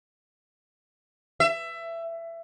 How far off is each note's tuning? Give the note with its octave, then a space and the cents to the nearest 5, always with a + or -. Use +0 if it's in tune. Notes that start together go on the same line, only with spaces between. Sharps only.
E5 +20